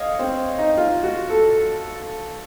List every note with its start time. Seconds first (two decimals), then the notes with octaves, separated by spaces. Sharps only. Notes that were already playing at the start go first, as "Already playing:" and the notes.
Already playing: C#5 D#5 F5
0.19 C4
0.59 D#4
0.77 F4
1.03 F#4
1.29 A4